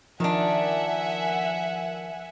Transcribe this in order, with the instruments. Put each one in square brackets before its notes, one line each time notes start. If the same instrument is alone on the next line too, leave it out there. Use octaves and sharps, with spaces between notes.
[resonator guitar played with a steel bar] D#3 D4 [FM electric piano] F3 A#4 A5 [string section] E5 F#5 G#5